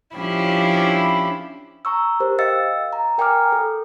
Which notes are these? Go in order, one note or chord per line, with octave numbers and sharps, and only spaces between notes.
F3 C#4 D4 E4 G4
A#5 C#6 E6
G4 A#4 C5
D#5 F5 G5 E6 A6 C#7
A#5
A#4 G5 G#5 A#5 D6 F6
A4